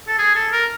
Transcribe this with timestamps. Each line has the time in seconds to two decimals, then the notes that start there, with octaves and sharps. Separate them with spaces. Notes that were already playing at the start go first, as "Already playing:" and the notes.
0.07 A4
0.18 G#4
0.35 A4
0.52 A#4